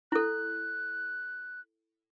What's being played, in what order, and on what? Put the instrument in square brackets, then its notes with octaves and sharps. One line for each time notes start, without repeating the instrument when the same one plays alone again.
[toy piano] E4 A4 [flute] F#6